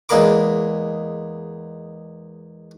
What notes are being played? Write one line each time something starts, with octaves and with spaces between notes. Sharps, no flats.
E2 G#3 A#3 A#4 B5 D6